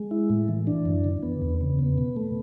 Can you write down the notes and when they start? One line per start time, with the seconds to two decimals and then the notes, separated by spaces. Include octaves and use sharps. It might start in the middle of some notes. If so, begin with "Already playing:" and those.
Already playing: G#3
0.11 E4
0.30 A2
0.48 E3
0.67 D4
0.85 F#2
1.04 D3
1.23 B3
1.42 E2
1.61 C#3
1.79 B3
1.98 B2
2.16 A3